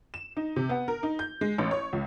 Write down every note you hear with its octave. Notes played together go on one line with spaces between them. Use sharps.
E7
D#4
C3
B3
A#4
D#4
G6
G#3
A1
C#5
C#2